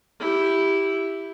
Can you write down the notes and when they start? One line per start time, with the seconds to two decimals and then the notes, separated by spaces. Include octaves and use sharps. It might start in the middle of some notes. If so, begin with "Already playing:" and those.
0.20 E4 G4